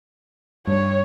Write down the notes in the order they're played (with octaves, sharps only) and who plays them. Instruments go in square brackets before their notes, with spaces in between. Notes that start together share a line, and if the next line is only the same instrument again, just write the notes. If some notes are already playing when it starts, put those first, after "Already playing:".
[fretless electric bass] G2 [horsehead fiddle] C#5